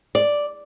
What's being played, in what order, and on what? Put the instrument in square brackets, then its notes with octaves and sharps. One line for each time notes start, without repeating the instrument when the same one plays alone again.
[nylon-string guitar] D5